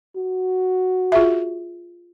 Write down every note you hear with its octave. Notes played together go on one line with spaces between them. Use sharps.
F#4
F4 G#4 E5